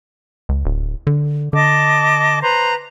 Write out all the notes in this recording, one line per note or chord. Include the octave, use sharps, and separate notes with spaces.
C#2
D1
D3
D3 D#5 A5 D6
B4 C5 A#5